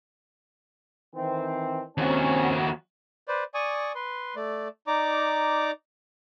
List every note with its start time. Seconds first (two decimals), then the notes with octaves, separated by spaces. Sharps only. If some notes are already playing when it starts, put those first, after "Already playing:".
1.16 D#3 E3 C4
1.98 D#2 C4 C#4 F#4
3.28 B4 C5 D5
3.54 D5 G#5 C#6 D#6
3.95 B4 C6
4.36 A3 D5
4.87 D#4 D5 A#5 D6